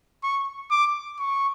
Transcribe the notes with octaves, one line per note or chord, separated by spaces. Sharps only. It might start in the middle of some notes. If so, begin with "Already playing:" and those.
C#6
D6
C#6